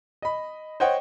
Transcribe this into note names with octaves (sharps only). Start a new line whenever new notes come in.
D#5 B5
C5 C#5 D#5 F#5 G5